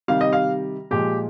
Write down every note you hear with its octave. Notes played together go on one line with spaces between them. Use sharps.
C3 D#3 G3 F5
D#5
F5
A#2 F3 G#3 G4